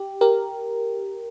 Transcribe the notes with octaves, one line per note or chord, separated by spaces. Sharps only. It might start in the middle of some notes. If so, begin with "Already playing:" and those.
Already playing: G4
G4 A#4